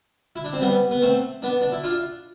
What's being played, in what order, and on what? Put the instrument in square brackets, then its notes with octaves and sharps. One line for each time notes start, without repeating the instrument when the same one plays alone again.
[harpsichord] E4
D4
C4
G3 B3
B3
A3 C4
B3 D4
D4
E4
D4 F4